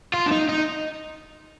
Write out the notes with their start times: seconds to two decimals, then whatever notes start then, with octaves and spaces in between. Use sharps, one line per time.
0.14 F4
0.26 D4
0.32 D#4
0.49 D#4